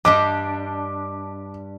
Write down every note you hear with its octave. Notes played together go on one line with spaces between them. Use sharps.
G2 G3 D4 D#5 D6